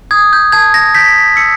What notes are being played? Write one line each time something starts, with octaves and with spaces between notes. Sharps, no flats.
D#6 G#6
G6
A5 G#6
A#6
G6 B6
E6 C#7